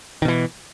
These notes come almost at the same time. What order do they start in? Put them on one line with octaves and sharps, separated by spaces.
D#3 B2 E3